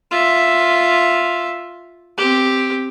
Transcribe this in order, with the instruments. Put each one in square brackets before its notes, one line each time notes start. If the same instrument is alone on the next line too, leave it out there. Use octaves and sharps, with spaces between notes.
[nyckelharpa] F4 E5
C4 G4